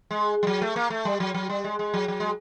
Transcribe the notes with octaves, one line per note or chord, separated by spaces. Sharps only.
G#3
G3
F#3
A3
A#3
A3
G3
F#3
F#3
G3
G#3
G#3
F#3
F#3
G#3